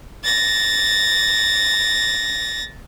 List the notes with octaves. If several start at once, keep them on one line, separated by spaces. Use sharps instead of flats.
A6 A#6